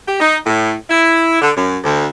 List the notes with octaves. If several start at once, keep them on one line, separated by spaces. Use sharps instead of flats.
G4
D#4
A2
E4
D3
F#2
D2